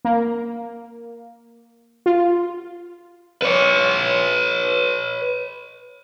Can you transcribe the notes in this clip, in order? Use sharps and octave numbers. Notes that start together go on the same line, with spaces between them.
A#3
F4
B4 C#5